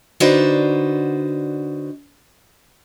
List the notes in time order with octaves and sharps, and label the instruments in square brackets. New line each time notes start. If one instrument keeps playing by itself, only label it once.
[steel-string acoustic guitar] D3 D#4 F#4 B4 C5 D5